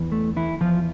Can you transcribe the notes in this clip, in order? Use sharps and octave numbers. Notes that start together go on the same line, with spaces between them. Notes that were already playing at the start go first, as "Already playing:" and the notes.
Already playing: E2 E3
A3
E3 E4
E2 E3 F3 F4